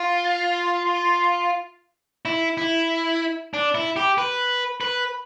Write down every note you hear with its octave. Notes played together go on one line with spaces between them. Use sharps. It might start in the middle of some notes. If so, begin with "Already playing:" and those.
Already playing: F4
E4
E4
D4
E4
G4
B4
B4